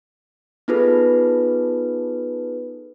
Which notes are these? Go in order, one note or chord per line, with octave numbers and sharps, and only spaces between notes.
B3 D#4 F4 G#4 A4 B4